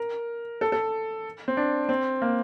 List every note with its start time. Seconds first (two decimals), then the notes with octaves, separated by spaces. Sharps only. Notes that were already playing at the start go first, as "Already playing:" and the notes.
Already playing: A#4
0.61 A4
0.72 A4
1.48 C4
1.57 D4
1.89 C4
2.22 A#3